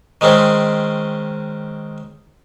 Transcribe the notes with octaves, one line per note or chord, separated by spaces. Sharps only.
D#3 G#3 C4 C#4